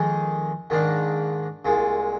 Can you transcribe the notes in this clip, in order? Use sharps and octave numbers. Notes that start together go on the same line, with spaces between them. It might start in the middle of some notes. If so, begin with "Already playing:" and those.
Already playing: F2 D#3 G#3 D#4 G#4
G#2 D#3 A#3 D4
C2 A#2 G#3